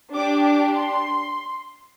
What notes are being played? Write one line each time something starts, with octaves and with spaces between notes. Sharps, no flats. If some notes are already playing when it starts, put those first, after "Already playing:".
D4 G4 D6
D6
C6